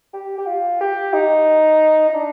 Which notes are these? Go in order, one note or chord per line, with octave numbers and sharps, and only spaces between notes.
G4
G4
F4
G4
D#4
D#4
D4